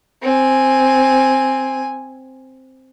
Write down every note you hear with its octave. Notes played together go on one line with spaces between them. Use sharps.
C4 G#5